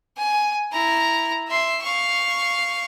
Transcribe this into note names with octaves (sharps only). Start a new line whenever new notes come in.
G#5
E4 A#5
E5 C6
F5 C#6